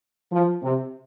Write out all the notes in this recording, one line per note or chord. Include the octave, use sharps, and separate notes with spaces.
F3
C3